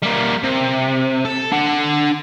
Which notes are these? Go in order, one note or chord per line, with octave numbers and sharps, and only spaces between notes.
G3 A#3
C3
A4
D4 F#5